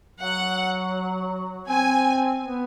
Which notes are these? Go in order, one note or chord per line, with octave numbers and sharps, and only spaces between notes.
F#3 F#5
C4 G#5
B3